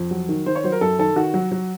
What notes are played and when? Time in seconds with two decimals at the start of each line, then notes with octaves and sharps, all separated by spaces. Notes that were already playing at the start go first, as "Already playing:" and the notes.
Already playing: F2
0.11 F#3
0.29 D#3
0.46 D#3 C5
0.56 C#5
0.64 F#3 C5
0.72 A#4
0.81 F#2 A4
0.99 D#3 A4
1.16 D#3 F#4
1.34 F#3
1.52 F#3